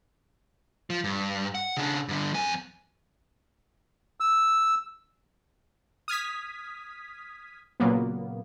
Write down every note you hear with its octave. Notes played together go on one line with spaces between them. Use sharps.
F3
G2
F#5
C#3 D4
G2 D3
F2 G#5
E6
D#6 F6 G#6 B6
A#2 C#3 F#3 A#3 B3